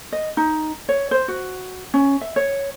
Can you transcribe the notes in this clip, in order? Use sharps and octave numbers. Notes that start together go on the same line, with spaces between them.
D#5
D#4
C#5
C5
F#4
C#4
E5
C#5